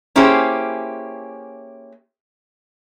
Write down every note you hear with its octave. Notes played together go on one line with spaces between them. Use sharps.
A#3 C#4 E4 G4 G#4 C5